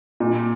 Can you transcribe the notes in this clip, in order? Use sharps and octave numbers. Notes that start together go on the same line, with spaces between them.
A#2